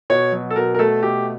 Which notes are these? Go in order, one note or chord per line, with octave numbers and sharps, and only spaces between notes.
B2 C#5
F#3
A4
B2 A#4
A#4
A3 A4
B2 G4